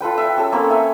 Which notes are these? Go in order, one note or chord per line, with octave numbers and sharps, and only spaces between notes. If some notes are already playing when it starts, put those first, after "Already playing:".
F4 A4 B4 G5
E5 G5
C#4 G#4 A4
A#3 C4 C#4
A3 E5 G#5